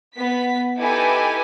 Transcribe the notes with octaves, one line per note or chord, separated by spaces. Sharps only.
B3 B6
D#4 E4 G4 A4 B4 G#5